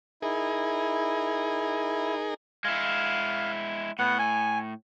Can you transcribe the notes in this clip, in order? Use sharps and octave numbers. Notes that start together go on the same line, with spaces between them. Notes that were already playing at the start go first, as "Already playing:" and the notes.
D#4 E4 G#4 A#4
G#3 E4 F5
A2 B3 F#5
G#5